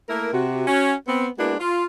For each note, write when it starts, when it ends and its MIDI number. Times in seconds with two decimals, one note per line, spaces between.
0.09 0.29 57
0.09 0.29 58
0.09 0.29 64
0.09 0.29 70
0.33 0.64 48
0.33 0.64 66
0.68 0.94 61
0.68 0.94 66
1.07 1.28 59
1.07 1.28 60
1.38 1.54 56
1.38 1.54 58
1.38 1.54 59
1.38 1.54 62
1.38 1.54 64
1.38 1.54 66
1.60 1.85 65